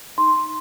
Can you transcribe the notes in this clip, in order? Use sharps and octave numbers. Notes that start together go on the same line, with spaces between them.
D#4 C6